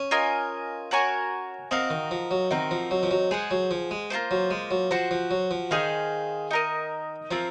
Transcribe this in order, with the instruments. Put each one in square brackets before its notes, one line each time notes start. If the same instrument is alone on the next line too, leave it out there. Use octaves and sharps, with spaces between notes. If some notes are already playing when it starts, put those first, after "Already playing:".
Already playing: [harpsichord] C#4
[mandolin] F4 A#4 D#5 G#5
F#4 A#4 C#5 G#5
[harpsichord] C4 [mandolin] D#4 F#4 A#4 F5
[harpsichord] D#3
F3
F#3
[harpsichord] D#3 [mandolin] C4 D#4 F#4 A#4
[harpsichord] F3
F#3
F3
F#3
[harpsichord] G#3 [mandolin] G#4 C5 F#5
[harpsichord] F#3
F3
G#3
[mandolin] A#3 F4 G#4 C5
[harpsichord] F#3
G#3
F#3
[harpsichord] F3 [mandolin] F#4 C5 F#5
[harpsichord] F3
F#3
F3
[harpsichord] D#3 [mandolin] D#4 G#4 C5 F5
[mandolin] D#4 A#4 D#5
[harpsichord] F3 [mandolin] C4 F4 A#4